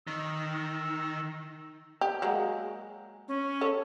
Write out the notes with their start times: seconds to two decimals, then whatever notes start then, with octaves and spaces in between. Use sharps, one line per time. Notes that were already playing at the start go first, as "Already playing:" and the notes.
0.07 D#3 E6
2.01 G4
2.22 F#3 G#3 A#3
3.28 C#4
3.61 A4 C#5